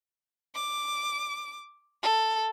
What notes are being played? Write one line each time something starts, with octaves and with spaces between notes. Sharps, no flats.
D6
A4